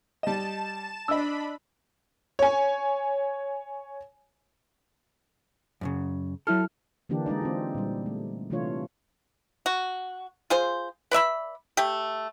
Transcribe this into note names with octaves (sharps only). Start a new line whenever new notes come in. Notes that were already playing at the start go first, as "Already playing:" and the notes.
G3 D#5 A5 E7
D4 D#5 B5 E6
C#5 G#5
F#2 A2 C#3
F#3 E4 A4 F6
D3 E3 A#3 D4 G4
G#3 D4 D#4 D5
C4 F4
A#2 G3
A3
C3 E3 A3 D4 F4 C#5
F#4
F4 G#4 C5
B4 D5 E5 B5
A3 G4